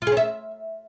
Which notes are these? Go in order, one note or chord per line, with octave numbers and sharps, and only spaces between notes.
F4
G#4
C#4
E5